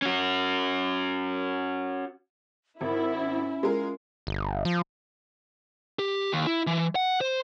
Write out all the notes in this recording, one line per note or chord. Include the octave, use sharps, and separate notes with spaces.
C#4 F#4
G#1 E4 A#4
C#4
G#3 F4 A#4
G1
F3
G4
D#2
E4
E3
F#5
C5